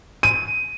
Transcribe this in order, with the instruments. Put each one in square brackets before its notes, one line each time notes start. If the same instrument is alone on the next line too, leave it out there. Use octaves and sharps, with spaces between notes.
[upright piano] D#7